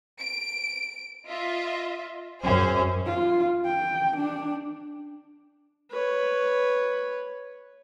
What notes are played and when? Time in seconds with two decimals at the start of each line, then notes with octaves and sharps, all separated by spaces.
0.19 D7
1.29 F4 D#5 E5
2.43 F#2 C#4 G#4 C5
3.06 F4
3.65 G5
4.17 D4
5.91 B4 C#5